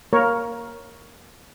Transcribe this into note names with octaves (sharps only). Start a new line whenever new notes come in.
A#3 A#4 C#5